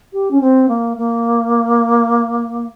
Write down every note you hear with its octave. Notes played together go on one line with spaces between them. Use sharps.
G4
C#4
C4
A#3
A#3